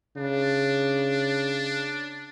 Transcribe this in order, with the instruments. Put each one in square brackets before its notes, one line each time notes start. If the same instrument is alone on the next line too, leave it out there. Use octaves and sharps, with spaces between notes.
[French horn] C#3 [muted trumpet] D4